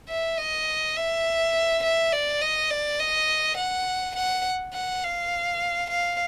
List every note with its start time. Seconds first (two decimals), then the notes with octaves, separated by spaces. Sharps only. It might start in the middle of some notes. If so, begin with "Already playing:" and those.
0.09 E5
0.38 D#5
0.96 E5
1.83 E5
2.12 D5
2.41 D#5
2.71 D5
3.00 D#5
3.58 F#5
4.16 F#5
4.74 F#5
5.03 F5
5.90 F5